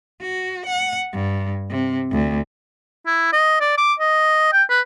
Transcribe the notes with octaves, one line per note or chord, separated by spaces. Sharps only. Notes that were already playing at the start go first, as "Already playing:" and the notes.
F#4
F#5
G2
C3
D2
E4
D#5
D5
D6
D#5
G5
B4